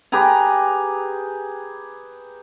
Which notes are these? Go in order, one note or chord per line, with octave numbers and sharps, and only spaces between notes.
G4 G#4 B4 A#5